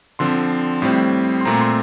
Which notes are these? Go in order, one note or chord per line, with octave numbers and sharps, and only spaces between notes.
D3 F3 C4 C6
A2 G3 C4
C6
A#2 A3 C4 A#5
C6